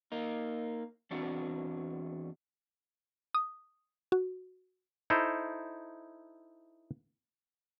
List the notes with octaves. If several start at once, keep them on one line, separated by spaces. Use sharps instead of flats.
A#3 D#4
E2 C4 D4 F#4
D#6
F#4
D#4 E4 A4 C5